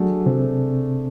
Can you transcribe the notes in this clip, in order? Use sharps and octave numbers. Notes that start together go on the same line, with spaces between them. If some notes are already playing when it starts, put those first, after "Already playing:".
Already playing: F#3 A3 D4 F#4 G#4
C3 C4